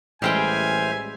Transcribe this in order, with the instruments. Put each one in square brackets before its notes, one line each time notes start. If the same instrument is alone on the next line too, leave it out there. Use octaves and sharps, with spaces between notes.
[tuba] A1 [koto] G3 G#3 G5 [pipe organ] C5 E5 F6 [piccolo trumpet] G#5